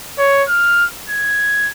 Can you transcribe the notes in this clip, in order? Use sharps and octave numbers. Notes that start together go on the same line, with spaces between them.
C#5
F6
G#6